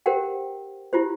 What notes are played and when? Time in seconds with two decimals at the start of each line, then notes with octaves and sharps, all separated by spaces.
0.06 G4 A#4 C5 F#5 G5
0.93 E4 F4 G4 C5